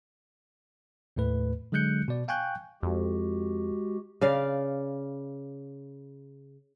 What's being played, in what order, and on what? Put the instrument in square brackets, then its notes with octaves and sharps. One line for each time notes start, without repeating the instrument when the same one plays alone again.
[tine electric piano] D#2 A2 A3 B4
D3 F#3 G#3 F#6 G6 C#7
B2 D5
F5 G5 G#5 C#6 F#6 G6
[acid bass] F2 [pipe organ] G#3 F#4 G4
[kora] C#3 D5 F5